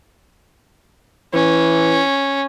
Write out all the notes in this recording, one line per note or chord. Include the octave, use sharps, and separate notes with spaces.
E3 C#4